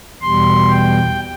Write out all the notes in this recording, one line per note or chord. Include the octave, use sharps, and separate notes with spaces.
E2 B2 G3 C6
G5